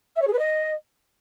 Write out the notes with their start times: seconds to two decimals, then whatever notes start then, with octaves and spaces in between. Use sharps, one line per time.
0.16 E5
0.21 C#5
0.27 G#4
0.33 B4
0.38 D#5